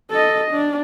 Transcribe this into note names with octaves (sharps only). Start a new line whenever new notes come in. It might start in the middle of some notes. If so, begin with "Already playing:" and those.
A4 D#5
D4